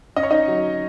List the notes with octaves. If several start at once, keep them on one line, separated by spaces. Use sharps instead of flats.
C#4 D#5
C#5
D#4 D#5
F#3